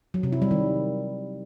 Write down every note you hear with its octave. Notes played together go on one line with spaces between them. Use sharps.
F#3
C3
E4
G3
D#3